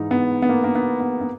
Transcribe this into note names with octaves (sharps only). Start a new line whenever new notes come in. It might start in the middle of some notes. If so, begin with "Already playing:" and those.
Already playing: G#2 E3 D#4
B3
B3
A#3
A#3
B3
B3
B3